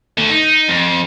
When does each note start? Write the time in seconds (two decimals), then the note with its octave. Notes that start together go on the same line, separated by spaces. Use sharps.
0.18 D3 A3
0.30 D#4
0.68 F2